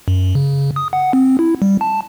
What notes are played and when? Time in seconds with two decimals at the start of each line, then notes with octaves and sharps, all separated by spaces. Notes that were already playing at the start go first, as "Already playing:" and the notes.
0.08 F#2
0.35 C#3
0.76 D#6
0.93 F#5
1.13 C4
1.39 E4
1.62 G3
1.81 A5